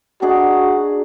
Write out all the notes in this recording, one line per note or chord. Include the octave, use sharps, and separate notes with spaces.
D4 D#4 F#4 G#4